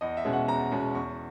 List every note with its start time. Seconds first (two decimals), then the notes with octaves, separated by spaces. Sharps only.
0.01 E2 D#5
0.17 E5
0.25 B2 G#3 C#4
0.33 F#5
0.48 E2 A#5
0.71 B2 G#3 C#4
0.94 E2 C#6